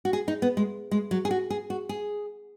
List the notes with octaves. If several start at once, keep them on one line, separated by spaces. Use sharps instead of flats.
F#4
G#4
D#4
B3
G#3
G#3
F#3
G#4
F#4
G#4
F#4
G#4